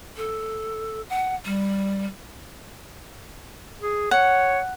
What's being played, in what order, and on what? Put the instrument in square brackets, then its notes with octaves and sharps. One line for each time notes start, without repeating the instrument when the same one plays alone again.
[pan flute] A4
F#5
G3
[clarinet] G#4
[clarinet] C#5 [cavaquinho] F#5